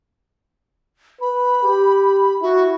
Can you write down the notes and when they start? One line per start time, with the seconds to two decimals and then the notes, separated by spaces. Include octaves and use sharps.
1.21 B4 B5
1.63 G4
2.42 E4 F#4